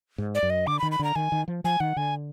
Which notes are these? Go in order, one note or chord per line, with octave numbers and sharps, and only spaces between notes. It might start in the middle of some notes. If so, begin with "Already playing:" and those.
G#2
D5
F#2
D#5
D3 D6
D#3 B5
B5
D3 A#5
D#3 G#5
D#3
F3
F3 G#5
D#3 F#5
D3 G#5